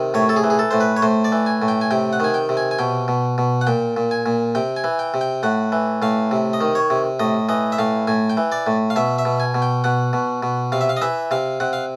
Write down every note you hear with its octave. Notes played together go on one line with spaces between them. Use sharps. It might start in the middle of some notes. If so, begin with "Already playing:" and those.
Already playing: C3 D#3
A2 C#5
A4
G#4
E3
G#4
A4
A2 C5
B4
C#5
A2 C5
D5
E3
G#5
A2
G5
G#5
C3 G5
F#5
D#3 G#5
G5
C3
G#5
G#5
B2 G5
B2
B2
F#5
A#2 G5
A#2
G#5
A#2
C3 G5
G#5
E3
G5
C3
G5
A2 F#5
E3
A2 F5
C3
D#5
D#3
C#5
C3
A2 D#5
E3 D#5
E5
A2 F5
A2 G#5
G5
E3
D5
A2
F5
B2 E5
E5
B2
G#5
B2
G5
B2 F#5
B2
B2
C3 F5
E5
F5
D#5
E3 E5
C3 F5
C3 F#5
F5